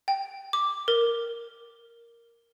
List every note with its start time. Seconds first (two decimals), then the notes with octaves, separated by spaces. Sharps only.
0.08 G5
0.53 D6
0.88 A#4